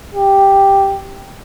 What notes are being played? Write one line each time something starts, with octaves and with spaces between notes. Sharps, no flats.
G4